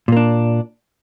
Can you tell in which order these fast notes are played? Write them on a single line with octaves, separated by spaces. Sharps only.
A#2 A#3 D4